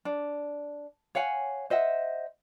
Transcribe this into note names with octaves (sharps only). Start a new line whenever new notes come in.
D4
C#5 F5 F#5 G#5
C5 D#5 E5 F#5